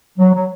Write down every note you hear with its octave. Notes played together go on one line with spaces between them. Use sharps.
F#3
F#3